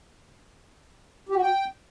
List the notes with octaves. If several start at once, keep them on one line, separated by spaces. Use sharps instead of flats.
G4
F#4
G5